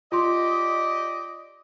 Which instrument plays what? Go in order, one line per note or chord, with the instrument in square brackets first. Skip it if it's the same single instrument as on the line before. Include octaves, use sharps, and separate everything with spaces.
[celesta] F4 C6 [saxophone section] G4 D5 D#5